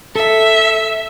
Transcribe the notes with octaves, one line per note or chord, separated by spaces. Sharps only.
A4 E5